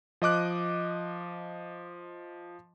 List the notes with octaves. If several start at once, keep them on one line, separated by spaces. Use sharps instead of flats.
F3 D#5 D6 F#6